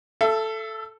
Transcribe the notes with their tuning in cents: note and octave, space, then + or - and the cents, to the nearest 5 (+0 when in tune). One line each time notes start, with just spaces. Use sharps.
A4 +0 E5 +35